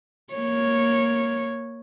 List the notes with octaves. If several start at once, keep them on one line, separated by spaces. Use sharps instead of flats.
A#3 C#5